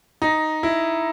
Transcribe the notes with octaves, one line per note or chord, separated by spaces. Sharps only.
D#4
E4